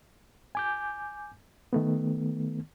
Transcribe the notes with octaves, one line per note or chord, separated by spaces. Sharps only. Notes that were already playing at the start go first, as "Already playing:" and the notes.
G#5 D6 G6
D#3 A3 B3